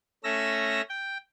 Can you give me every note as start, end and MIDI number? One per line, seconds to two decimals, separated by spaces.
0.24 0.81 57
0.24 0.81 61
0.24 0.81 88
0.24 0.81 94
0.89 1.18 79